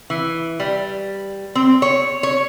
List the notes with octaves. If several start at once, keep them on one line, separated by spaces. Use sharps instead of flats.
E3
G3
C4
C#5
C#5